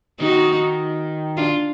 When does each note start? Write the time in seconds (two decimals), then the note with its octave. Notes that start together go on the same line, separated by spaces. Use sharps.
0.20 D#3 D#4 F#4
1.37 D4 F4